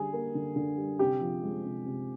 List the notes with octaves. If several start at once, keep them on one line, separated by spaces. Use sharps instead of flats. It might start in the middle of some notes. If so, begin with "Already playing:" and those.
Already playing: D3 G3 G#4
A#3
D3
D3
G3
C3 G4
F3
G#3
C3
C3